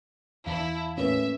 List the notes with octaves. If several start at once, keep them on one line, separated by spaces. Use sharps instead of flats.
E2 E3 E4 F5 A5
A2 A3 A#3 C#4 B4 E5